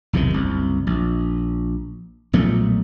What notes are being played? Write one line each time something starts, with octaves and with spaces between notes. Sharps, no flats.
B1 E2 C3 D#3
F#1 C2
A#1
B1 A#2 F3 A3